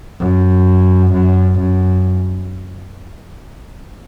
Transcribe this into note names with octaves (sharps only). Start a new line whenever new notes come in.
F#2
F#2
F#2